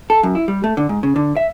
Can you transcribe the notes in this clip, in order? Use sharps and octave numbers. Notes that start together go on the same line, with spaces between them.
A4
F#2
E4
G3
A3
D3
G#2
C#3
D3
E5